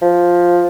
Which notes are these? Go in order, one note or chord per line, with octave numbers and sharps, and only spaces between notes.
F3